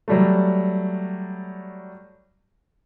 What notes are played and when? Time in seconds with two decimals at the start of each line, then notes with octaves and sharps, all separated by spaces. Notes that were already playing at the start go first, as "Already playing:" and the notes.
0.08 F#3 G3 A3